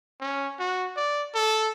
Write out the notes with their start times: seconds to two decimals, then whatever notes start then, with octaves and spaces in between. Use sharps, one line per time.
0.20 C#4
0.59 F#4
0.97 D5
1.35 A4